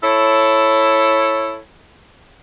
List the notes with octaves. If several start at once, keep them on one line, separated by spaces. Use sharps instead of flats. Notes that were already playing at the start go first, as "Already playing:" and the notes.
E4 A4 C#5